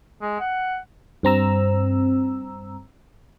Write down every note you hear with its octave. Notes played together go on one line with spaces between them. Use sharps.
G#3
F#5
G2 C4 A#5 E6